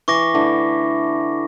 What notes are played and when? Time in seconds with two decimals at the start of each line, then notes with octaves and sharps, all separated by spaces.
0.08 E3 C#6 D6 A#6
0.34 D3 E3 A3